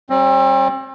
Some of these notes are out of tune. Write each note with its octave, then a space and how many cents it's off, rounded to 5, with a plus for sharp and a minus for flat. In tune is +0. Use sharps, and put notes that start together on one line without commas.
G3 -25 C4 +40